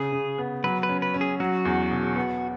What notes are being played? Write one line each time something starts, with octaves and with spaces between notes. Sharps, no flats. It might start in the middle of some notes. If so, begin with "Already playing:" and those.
Already playing: C#3 G#4
C#3
B3
F#3 B4
B4
C#4
B4
C#4
G#4
F#3 F#4
E2
E1
B3